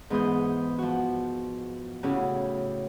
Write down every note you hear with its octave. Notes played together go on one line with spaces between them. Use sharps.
G#2 E3 B3 G#4 D#6 G6
F3 F#4
A2 C#3 E4 F#4 G4